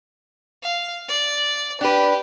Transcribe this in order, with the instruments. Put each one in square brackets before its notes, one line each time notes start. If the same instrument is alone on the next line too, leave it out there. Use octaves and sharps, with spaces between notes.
[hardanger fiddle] F5
D5
[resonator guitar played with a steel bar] D4 B4 [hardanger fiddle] G4